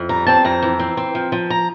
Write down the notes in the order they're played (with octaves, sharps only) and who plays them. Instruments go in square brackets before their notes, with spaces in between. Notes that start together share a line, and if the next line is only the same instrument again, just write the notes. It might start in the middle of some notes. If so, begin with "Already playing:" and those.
Already playing: [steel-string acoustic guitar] F2
G3 A#5
C4 A5
F2 A#5
E3
C4
C4
F3
F3
A#5